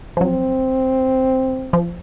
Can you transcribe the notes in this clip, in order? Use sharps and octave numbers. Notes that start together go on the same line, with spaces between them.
F3
F#3 C4
F3